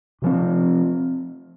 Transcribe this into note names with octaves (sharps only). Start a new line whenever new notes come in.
C3 F3 C4